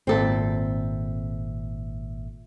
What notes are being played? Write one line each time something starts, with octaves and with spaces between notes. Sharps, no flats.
G#1 A#2 C4 A4 E5